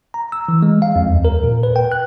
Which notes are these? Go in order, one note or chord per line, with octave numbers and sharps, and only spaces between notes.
A#5
E6
E3
G#3
F5
F2
D#2
A#4
A#2
B4
G5
F#6